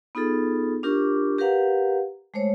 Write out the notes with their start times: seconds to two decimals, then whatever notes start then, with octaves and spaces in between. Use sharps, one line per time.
0.15 B3 D#4 F4 G#4 A4
0.83 D4 F4 G4 A#4 C#6 D6
1.38 G4 A#4 B4 F5 F#5 A#5
2.34 G#3 A3 C5 C#5